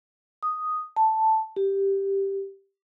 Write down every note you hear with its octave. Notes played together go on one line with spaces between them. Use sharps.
D#6
A5
G4